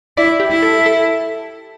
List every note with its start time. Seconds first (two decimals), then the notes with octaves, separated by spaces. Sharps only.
0.17 E4 D5
0.40 G4
0.51 E4
0.62 A4
0.86 A4